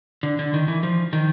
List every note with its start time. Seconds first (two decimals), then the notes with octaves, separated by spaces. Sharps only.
0.23 D3
0.39 D3
0.54 D#3
0.68 E3
0.83 F3
1.13 D#3